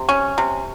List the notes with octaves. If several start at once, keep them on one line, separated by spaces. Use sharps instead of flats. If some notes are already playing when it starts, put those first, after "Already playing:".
Already playing: C3
C#4
C3